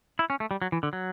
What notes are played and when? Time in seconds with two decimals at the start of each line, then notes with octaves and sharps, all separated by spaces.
0.19 E4
0.30 C#4
0.40 A3
0.51 G3
0.62 F#3
0.72 E3
0.83 D3
0.93 F#3